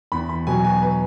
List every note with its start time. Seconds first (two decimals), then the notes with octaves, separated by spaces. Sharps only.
0.12 E2 B5
0.29 B5
0.47 B2 F#3 G#5
0.64 G#5
0.82 B4